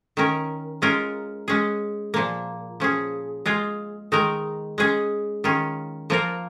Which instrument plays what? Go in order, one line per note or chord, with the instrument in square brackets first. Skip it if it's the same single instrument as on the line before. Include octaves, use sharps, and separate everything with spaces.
[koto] D#3 C#4 A#4
G#3 C#4 F4 A#4
G#3 C#4 G#4
A#2 F3 A#3
F3 C#4 G#4
G#3 F4 G#4
D#3 G#3 D#4 A#4
G#3 C#4 G#4
D#3 C#4 F4
F3 A#3 F4 A#4